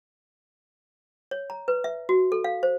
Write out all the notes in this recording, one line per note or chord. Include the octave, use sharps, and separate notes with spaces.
C#5
A#5
B4
E5
F#4
A4
F5
C5